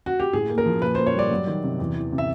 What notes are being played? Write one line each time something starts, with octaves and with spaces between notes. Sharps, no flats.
F#4
G4
A2 G#4
A#3
A#4
F3
A#2 B4
C5
A#3
C#5
G3 D5
F#3
D#3
C3
E2
E3
C3
E5